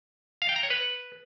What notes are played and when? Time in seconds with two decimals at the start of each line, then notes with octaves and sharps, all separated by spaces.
0.42 F5
0.49 G5
0.56 A#5
0.63 C#5
0.70 B4